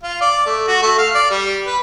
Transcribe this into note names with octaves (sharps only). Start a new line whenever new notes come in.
F4
D5
A3
F#4
A3
F5
D5
G3
B4